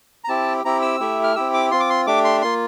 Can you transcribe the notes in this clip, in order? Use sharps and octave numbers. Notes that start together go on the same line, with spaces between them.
A#5
C4 E4 G4 A5
C4 E4 G4 A#5
E6
A3 E4 G4
F6
C4 E4 G4 E6
D6
C4 F4 C6
D6
C6
A3 D4 G4 D6
C6
A#3 F4 C6